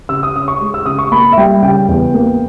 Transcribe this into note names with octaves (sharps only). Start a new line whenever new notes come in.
C#3 E6
D#6
C#4 D#6
C#6
G#3
E6
C#3 D#6
C#6
A#3 B5
E5
G3 G5
C#3 G5
E2
A#3